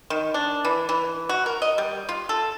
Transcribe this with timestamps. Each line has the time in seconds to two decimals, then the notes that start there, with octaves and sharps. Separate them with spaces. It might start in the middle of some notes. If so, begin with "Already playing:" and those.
0.10 D#3
0.34 D4
0.65 E3
0.89 E3
1.29 F#4
1.46 A#4
1.62 D#5
1.78 G3
2.09 F4
2.29 A4